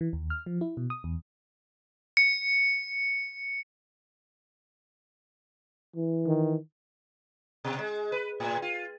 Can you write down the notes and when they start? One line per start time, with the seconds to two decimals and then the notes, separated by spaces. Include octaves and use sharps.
0.01 E3
0.13 D#2
0.30 F6
0.46 F3
0.61 E4
0.77 B2
0.90 D#6
1.04 E2
2.17 C#7
5.96 E3
6.27 D#3
7.65 B2
7.79 G#3
8.12 B4
8.40 A2
8.62 F4